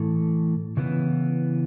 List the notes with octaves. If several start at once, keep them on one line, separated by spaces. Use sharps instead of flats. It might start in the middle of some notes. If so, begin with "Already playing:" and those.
Already playing: A2 E3 A3
C#3 E3 B3 E4